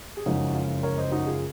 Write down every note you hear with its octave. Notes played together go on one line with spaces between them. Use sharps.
G#4
F#1 F2 C#3 G#3 C#4 D#4 F#4
F4
A#4 C#5
C5 D#5
D#4 F#4
F4 G#4